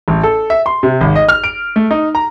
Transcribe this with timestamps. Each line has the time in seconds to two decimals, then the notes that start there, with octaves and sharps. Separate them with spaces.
0.08 A1
0.23 A4
0.50 E5
0.66 C6
0.83 C3
1.01 G#1
1.16 D#5
1.29 F6
1.44 D7
1.76 A3
1.91 D#4
2.15 A#5